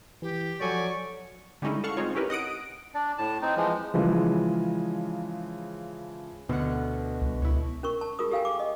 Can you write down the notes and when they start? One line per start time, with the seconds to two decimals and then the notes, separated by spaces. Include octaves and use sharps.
0.22 E3 G4
0.61 F3 F#3 A4 D5 G#5 C#6
1.62 D3 G3 G#3 C#4 D#4 E4
1.84 A4 F5 F#5 C#6
1.97 G#3 C4 C#4 D#4 F4 C#5
2.15 C#4 E4 G4 A#4 B4
2.30 D#5 F#5 D#6 D7
2.95 D4 D5
3.18 A2 A5
3.42 C4 D#4
3.56 E3 F3 G#3
3.94 C#3 E3 F3 G#3
6.49 D2 B2 F#5
7.21 C2
7.42 C#2 E4 C#5
7.83 C#4 A#4 C#6
8.01 A5
8.19 F4 G#4 A#4 D#6
8.31 G4 A4 F5 G5 G#5
8.45 D6
8.60 D#5